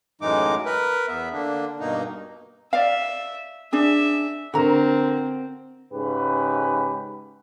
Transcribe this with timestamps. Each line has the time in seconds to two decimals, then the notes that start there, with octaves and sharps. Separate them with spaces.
0.21 F#2 A2 E3 G#3 D#4 D6
0.65 A#4 B4
1.08 E2 B3 E5
1.33 D3 A#3 D4
1.80 G2 B2 A#3 D#4
2.73 D5 E5 F5
3.73 D4 G#4 E5
4.54 D3 C4 F#4 A#4 A#5
5.93 G#2 C#3 G4 B4